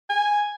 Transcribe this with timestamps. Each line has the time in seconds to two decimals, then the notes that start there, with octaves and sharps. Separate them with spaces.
0.09 G#5